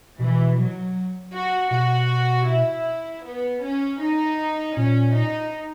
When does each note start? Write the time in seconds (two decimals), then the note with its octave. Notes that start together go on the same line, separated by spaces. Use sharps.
0.19 B2 E3
0.57 F#3
1.33 F#4
1.71 B2 F#4
2.47 E4
3.24 B3
3.63 C#4
4.00 D#4
4.76 A#2 C#4
5.14 D#4